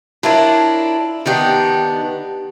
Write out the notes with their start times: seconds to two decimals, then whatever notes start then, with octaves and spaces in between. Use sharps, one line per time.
0.23 D4 E4 F4 A#4 C#5 D5
1.26 D#3 B3 D4 D#4 G4